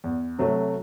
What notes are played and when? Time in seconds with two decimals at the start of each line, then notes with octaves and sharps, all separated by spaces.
0.04 E2
0.39 C3 F#3 A3